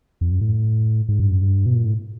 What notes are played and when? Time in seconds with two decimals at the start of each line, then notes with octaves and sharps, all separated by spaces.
0.21 F2
0.31 F#2
0.41 A2
1.08 G#2
1.20 G2
1.30 F#2
1.41 G2
1.66 B2
1.75 A#2
1.85 A2